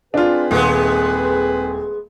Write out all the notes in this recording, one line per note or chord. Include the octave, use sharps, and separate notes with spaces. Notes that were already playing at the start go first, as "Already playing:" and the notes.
C4 D4 F4 G#4 B4
D#1 G#3 B3